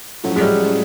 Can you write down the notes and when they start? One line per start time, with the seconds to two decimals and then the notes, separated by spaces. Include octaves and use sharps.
0.24 A2 F3 F#3 A3 C#4
0.36 G#3
0.41 G3